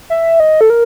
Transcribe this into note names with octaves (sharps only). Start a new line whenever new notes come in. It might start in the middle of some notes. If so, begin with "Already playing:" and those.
E5
D#5
A4
A#4